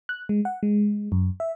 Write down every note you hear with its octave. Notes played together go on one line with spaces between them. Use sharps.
F#6
G#3
F#5
G#3
F#2
E5